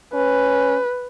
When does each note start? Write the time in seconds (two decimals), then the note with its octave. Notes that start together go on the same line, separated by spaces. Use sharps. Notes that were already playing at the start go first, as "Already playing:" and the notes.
0.14 C#4 B4